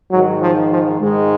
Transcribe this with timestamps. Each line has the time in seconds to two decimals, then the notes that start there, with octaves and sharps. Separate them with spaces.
0.11 G#2 D#3 F#3
0.41 F3
0.71 F3
1.01 G#2 D#3 G#3